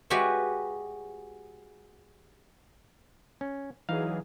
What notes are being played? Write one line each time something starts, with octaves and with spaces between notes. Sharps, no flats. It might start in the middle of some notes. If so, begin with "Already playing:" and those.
G#3 F#4 G4 B4 C#5 E5
C#4
E3 F#3 D#4 G#4 F5